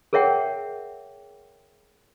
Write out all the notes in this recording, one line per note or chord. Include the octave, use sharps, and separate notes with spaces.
G#4 A#4 C#5 E5 F#5 G5